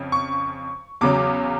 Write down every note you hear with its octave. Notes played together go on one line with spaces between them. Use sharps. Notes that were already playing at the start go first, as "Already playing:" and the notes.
Already playing: F2 C#3
C#6
E2 C#3 F#3 D6